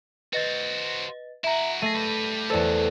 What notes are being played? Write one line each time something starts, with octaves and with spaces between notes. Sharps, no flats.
F#4 B4 C5 D#5 A6
E4 F#4 E5 A#5
A3 G#4 A#6 D#7
G3 B4
B1 E2 A2 A4 C5 D5